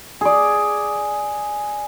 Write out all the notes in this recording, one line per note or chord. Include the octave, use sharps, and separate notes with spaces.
G#4 D5